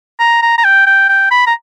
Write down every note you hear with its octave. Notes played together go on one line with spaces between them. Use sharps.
A#5
A#5
A#5
G5
G5
G5
B5
A#5